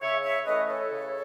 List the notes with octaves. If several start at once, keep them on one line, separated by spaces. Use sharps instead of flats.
C#3 C#5 E5
C#5 E5
E3 A3 C#4 B4 D#5
A4 C#5
C#3